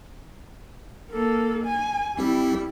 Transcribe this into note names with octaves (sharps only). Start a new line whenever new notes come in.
A#3 A4
G#5
C2 G3 C4 E4 G4